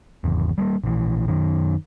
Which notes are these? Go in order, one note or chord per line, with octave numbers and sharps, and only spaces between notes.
G#1 E2
G3 A3 A#3
A#1 E3
F#2 D#3